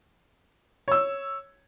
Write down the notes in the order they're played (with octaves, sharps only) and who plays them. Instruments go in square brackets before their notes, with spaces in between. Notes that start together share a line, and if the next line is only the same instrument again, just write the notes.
[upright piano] C#5 E6